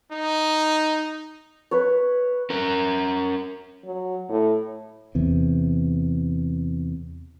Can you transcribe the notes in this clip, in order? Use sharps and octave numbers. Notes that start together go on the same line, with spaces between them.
D#4
B4 C#5
C#4 A#4
F#3
A2
E2 C3